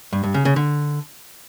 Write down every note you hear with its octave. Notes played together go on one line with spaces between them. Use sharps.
G2
G2
C#3
C#3
D3